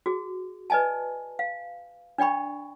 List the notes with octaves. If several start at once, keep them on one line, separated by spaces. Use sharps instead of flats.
F#4 G#4
B4 D5 D#5 G#5 A5
F5
D4 D5 G5 B5 C#6